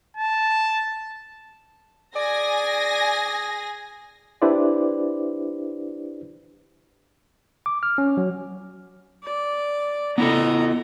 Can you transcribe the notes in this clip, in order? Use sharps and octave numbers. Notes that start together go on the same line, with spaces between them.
A5
G#4 D5 G#5 A#6
D4 E4 G4 B4 C5 D5
D6
F6
C#4
F#3
D5
B3 E4 A4 D#5 A#5